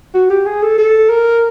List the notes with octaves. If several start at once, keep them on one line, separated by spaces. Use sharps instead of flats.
F#4
G4
G#4
A4
A4
A#4